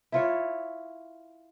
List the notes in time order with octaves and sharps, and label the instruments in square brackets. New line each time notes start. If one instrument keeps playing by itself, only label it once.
[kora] E4 F4 C#5